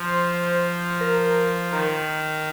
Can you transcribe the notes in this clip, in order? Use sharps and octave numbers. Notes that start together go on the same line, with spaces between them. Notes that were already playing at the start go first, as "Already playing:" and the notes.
Already playing: F3 C5
A#4
D#3 A#4